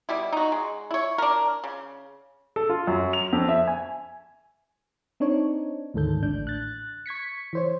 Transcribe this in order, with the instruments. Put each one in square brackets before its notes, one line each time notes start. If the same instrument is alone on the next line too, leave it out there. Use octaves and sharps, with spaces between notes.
[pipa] B2 G3 E4
D#4 F#4
G#3
E4 C#5
D4 A#4
C#3
[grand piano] A4
F4
F#2
F7
F2
E5
G#5
[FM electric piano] C4 D4 D#4 C#5
D2 G#2 D#3 A4 G6
A1 A2 D4 G6
F#6 A6
C#6 G#6 B6 C#7
E3 C5 C#5